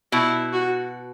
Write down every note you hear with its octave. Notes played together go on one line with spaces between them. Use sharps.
B2 E4
F#4